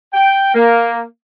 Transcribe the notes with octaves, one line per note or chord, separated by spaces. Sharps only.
G5
A#3